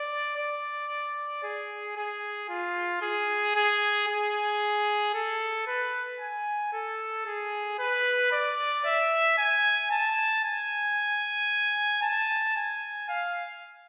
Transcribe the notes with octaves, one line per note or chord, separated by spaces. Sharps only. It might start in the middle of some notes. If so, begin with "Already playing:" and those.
Already playing: D5
D5
G#4
G#4
F4
G#4
G#4
G#4
A4
B4
G#5
A4
G#4
B4
D5
E5
G#5
A5
G#5
A5
G#5
F5